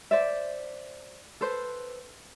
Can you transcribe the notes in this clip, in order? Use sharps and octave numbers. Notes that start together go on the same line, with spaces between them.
C5 D5 E5
A4 B4 C5